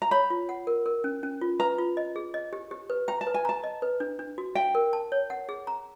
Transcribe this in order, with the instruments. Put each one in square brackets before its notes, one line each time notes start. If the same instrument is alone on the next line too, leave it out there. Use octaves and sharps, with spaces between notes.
[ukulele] A#5
[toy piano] C#5 [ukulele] B5
[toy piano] F4
F#5
A#4
A#4
C#4
C#4
F4
[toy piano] B4 [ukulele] A#5
[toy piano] F4
D#5
G#4
D#5
G4
G4
B4
[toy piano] G5 [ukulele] A#5
[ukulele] A5
[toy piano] B4
[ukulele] G#5
[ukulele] A5 [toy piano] A#5
[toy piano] D#5
B4
D4
D4
F#4
[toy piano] F5 [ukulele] G5
[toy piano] A#4
A5
C#5
F#5
G#4
A#5